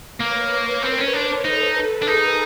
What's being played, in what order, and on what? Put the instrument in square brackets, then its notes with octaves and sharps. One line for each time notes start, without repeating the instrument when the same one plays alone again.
[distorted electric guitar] A#3 [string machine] B4 C#5
[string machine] B4 C#5
[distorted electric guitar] C4 [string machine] A#4 C5
[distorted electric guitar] C#4
D4
[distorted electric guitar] D#4 [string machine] A4 B4
[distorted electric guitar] D4
[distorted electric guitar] D#4 [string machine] G#4 A#4